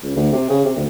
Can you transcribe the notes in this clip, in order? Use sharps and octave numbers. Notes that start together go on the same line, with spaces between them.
C#2
D2
C3
C#3
C3
D2